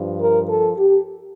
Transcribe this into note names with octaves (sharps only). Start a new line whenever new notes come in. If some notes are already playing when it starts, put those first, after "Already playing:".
Already playing: G2 F3
A#4
A4
G4